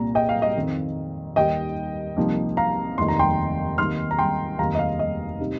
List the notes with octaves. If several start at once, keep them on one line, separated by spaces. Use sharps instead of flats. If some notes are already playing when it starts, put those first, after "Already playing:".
Already playing: C2 A#2 A#3 A#5
D#5 G5
F5
D#5
F2 D#3 C4
D#2 D#3 G3 D#5 G5
C2 C3 F3 A#3 D#4
F5 A#5
F1 D#2 D#3 C6
A#5
G5 C6
D#2 D#3 C4 D#4 C6 F6
A#5
G5 C6
F1 D#2 D#3 F5 A#5
D#5
F5
D#5
C3 G3 C4 D#4